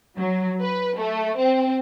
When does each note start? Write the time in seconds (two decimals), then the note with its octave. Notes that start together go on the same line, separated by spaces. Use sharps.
0.18 F#3
0.61 B4
0.98 A3
1.38 C4